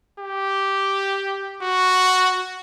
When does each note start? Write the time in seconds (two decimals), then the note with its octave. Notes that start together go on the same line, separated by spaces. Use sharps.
0.19 G4
1.61 F#4